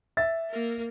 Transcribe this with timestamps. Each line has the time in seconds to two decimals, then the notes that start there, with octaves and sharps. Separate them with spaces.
0.17 E5 A6
0.50 A#3 A#4